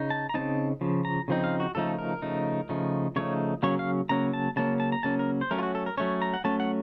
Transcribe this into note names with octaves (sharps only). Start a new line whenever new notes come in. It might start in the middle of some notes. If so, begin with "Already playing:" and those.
Already playing: C#3 D#4
A5
A#5
C#3 F3 C4 D#4 A5
C#3 F3
A#5
C#3 F3 C4 D#4
F5
F#4
C#3 F3 A3 D#4 A4
A#4
C#3 F3 A3 D#4
C#3 F3 A3 D#4
C#3 F3 A3 D#4 C#5
C#3 F#3 A#3 C#4 C#5
F5
C#3 F#3 A#3 C#4 A#5
A5
C#3 F#3 A#3 C#4 A5
A5
A#5
C#3 F#3 A#3 C#4 A5
A#4
C5
F#3 A3 C#4 A#4
F4
F#4
A4
A#4
F#3 A3 C#4 C#5
A#5
F#5
F#3 A3 C#4 A5
F#5